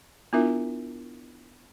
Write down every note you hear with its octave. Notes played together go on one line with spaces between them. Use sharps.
B3 D4 E4 F4 A#4 E5